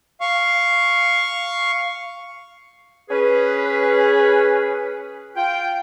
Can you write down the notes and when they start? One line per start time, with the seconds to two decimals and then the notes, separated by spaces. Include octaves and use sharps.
0.21 F5 C#6
3.10 C#4 G#4 B4
5.36 F4 G5